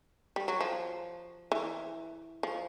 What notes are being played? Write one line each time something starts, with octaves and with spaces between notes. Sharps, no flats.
G3
F#3
F3
E3
F3